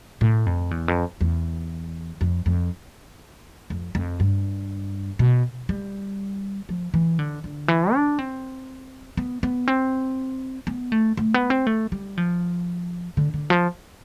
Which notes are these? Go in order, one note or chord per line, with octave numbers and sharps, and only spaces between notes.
A2
F2
E2
F2
E2
F2
F2
F2
F2
G2
B2
G3
F3
E3
D3
D3
E3
D4
C4
B3
B3
C4
B3
A3
A3
B3
C4
A3
G3
F3
D3
D3
F3